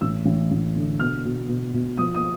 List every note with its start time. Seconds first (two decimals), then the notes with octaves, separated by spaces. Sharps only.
0.01 A1 E6
0.26 A1
0.51 A1
0.76 D3
0.99 B2 F6
1.25 B2
1.49 B2
1.74 B2
1.97 F3 D#6
2.15 D#6